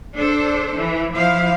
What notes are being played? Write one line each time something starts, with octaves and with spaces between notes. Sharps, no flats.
D4 A4 C5
E3
F3 E4 C5 F5